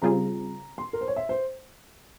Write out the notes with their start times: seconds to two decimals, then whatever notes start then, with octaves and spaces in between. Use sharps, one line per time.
0.02 C#3 G3 C4 F4 G#4 A#5
0.78 C6
0.93 A#4
1.01 C5
1.08 C#5
1.16 E5
1.29 C5